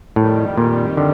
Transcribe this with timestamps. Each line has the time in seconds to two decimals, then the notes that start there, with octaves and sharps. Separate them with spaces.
0.16 F2 A2 D#3 G3
0.58 A#2
0.97 D3